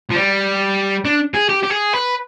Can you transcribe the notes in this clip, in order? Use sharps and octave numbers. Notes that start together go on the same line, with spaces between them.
F3
G3
D4
G#4
G4
G4
G#4
B4